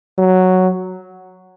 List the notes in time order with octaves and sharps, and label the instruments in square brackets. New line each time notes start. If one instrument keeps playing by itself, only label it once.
[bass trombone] F#3